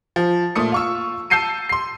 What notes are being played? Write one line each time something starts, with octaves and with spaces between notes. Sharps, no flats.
F3
A#2 A3 D#6 C#7
F4 C#6 E6
A5 E6 G6 C7 C#7 D#7
C6 C7